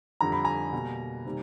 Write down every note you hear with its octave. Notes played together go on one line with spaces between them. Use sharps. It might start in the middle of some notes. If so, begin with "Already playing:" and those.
F2 D3 G3 A#5
B5
G#5 A#5
B2 G3 A#3
C3 D#3 G3 A#3